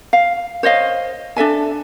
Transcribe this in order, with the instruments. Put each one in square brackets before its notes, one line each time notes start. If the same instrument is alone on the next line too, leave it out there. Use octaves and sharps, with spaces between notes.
[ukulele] F5
C5 C#5 D#5 F5
D4 A4 E5 G#5